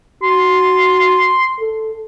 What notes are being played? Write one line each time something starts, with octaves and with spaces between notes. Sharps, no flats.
F#4 C6
A4